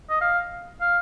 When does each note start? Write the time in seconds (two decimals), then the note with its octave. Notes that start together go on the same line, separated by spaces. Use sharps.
0.10 D#5
0.21 F5
0.81 F5